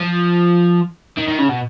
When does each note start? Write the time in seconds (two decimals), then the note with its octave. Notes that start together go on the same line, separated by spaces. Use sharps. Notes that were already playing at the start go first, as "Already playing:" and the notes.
Already playing: F3
1.18 D#3
1.28 D#3
1.39 C#3
1.49 B2